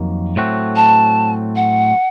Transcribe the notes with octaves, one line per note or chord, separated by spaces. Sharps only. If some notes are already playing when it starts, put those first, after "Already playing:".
Already playing: F2 D#3 F#3 A#3
A2 F#3 A3 C4 F#4
A5
F#5